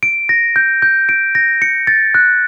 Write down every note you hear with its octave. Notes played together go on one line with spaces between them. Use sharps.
D7
A#6
G6
G6
D7
A#6
C#7
A6
F#6